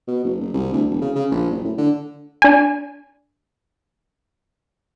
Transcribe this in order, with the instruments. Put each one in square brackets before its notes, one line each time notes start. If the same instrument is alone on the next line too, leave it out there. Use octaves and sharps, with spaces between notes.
[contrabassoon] B2
F#1
F#1
C2
D2
E1
C#3
C#3
A#1
F#1
A2
D3
[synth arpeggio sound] D4 G#5